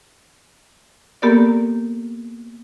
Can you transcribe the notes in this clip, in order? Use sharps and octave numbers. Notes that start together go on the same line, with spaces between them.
A#3 B3 G4 A4 A#4 D5